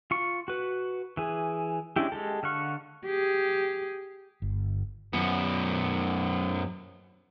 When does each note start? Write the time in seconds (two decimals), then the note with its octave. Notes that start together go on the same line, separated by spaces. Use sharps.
0.11 F4 C#6
0.48 F#4 B4
1.17 E3 G#4
1.96 G#3 C#4 D4 E4 G4
2.12 G#3 G4 A4
2.43 D3 F5 F#5 C#6
3.05 G4 G#4
4.42 G1
5.13 F#2 B3